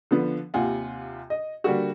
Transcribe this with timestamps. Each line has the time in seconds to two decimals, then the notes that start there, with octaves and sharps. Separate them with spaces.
0.11 D3 F3 B3
0.54 D#2 C3 F4 F#5 G#5
1.30 D#5
1.64 D3 G3 A#3 F#4